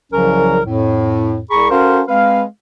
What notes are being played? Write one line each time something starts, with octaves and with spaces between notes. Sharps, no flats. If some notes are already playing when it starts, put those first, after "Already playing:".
C2 C#3 F3 F#3 C#4 A#4
F2 A2
C2 G#4 A#5 B5 C#6
C#4 F#4 A4 A#4 C5 F5
G#3 C4 B4 F5